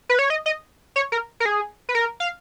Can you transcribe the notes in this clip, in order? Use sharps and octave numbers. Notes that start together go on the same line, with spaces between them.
B4
C#5
D#5
D#5
C#5
A#4
A#4
G#4
B4
A#4
F5